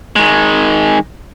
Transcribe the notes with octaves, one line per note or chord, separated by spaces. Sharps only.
D#3 G#3